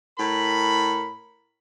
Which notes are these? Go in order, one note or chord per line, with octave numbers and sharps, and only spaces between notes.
A2 A#4 B5